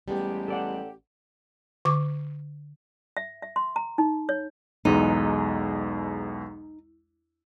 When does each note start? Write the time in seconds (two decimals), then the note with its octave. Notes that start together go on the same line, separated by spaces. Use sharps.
0.08 A1 G3 G#3 B3 G4
0.48 A4 D5 F#5
1.85 D3 C#6 D6
3.17 E5
3.42 E5
3.56 C6
3.76 A#5
3.98 D#4
4.29 C#5
4.85 B1 E2 G#3 D#4